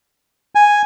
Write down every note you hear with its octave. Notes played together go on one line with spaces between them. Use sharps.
G#5